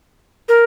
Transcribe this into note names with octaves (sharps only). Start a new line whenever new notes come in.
A#4